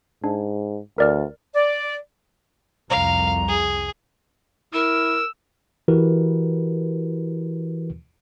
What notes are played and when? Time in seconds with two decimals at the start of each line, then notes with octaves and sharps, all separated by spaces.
0.24 G#2 D4
0.98 D2 A#4 D5 F6
1.54 D5
2.90 C2 F2 F5 A#5
3.48 G#4
4.74 E4 A#4 E6
5.88 E3 E4 F#4 G4 A#4 B4